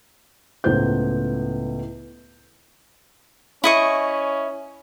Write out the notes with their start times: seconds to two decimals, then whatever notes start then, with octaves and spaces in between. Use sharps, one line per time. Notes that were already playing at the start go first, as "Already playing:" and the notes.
0.64 C#2 A2 B3 C5 G6
3.64 C#4 E4 D#5 C#6